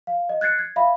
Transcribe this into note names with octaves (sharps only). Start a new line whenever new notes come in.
F5
D#5
F#6 G#6 A6 C7 C#7
G#6
E5 F5 B5